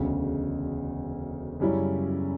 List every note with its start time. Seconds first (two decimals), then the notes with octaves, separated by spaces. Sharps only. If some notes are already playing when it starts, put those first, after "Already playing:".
Already playing: E1 D2 C#3
1.60 F#2 C#3 G3 C#4 E4